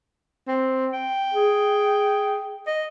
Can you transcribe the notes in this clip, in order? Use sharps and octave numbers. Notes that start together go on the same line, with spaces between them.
C4
G5
G#4
D#5